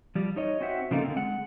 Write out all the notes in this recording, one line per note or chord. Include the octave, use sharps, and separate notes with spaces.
F3 G3
D#4 C#5 D#5
C4 F#4 C5 E5 F#5
C#3 F3 A#3 D#4 F4 A4
D3 C4
G#3 F#5